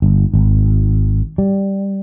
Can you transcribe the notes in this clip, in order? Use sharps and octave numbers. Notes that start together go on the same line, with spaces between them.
G1
G#1
G3